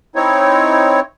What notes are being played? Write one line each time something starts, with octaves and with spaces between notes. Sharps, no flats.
C4 D#4 E4 C#5